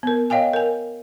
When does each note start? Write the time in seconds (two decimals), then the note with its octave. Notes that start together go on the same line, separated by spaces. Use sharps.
0.03 B3 A#4
0.30 C#5 D#5 F5 G5 G#5
0.53 A#4 G#5